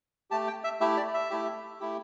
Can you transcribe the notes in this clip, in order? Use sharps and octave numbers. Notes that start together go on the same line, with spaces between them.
A3 G4 A5
G5
E5
A3 E4 G4 E5
D5
E5
A3 E4 G4
A3 E4 G4